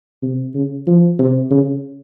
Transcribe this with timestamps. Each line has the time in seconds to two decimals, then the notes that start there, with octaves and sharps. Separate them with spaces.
0.22 C3
0.54 C#3
0.87 F3
1.19 C3
1.50 C#3